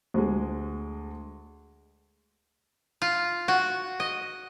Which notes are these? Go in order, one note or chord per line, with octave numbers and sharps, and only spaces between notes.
D2 G#3
F4
F#4
D#5